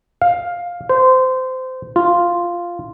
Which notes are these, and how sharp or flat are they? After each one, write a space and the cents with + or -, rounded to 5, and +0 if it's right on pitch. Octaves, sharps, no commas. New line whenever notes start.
F5 +10
C5 -20
F4 -5